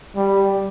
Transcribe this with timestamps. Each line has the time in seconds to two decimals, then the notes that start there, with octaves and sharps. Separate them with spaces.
0.16 G3